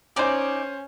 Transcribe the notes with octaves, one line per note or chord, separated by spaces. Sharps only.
C#4 D#4 C5 D5 G#5